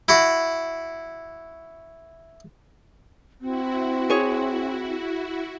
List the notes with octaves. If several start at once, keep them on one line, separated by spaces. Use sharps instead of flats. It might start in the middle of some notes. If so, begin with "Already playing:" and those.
E4 F#4
C4 E4 F#4
G#4 C#5